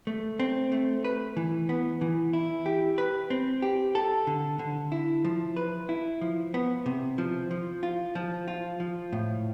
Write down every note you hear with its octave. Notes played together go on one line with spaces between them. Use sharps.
A3
C4
A3
B4
E3
B3
E3
E4
G4
B4
C4
G4
A4
D3
D3
E4
F3
B4
E4
F3
B3
C3
F3
F3
F4
F3
F4
F3
A2